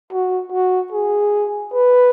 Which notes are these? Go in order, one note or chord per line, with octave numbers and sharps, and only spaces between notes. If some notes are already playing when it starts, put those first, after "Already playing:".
F#4
F#4
G#4
B4